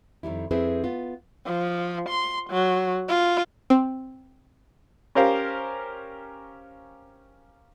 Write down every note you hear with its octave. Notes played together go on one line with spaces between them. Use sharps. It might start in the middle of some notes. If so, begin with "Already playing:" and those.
F2 D#3 G3 E4
F2 C4 E4 G#4 B4 C5
B3 F4
F3
C6
F#3
F4
C4
C#4 G4 A#4 C5 F5